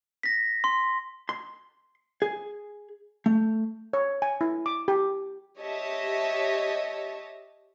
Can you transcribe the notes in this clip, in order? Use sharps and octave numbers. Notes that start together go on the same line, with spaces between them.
A#6 B6
C6
C6
G#4
A3
C#5
G#5
E4
D6
G4
G4 C#5 D#5 E5 A5